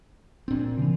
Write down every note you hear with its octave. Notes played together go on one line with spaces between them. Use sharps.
A#2 C4 D4
C#3 E3